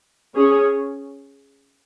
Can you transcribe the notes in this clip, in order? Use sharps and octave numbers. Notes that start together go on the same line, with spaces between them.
C#4 G#4 C#5